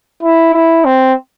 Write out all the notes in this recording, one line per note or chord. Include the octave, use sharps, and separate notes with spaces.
E4
E4
C4